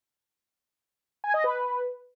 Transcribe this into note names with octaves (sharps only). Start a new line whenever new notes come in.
G#5
D#5
B4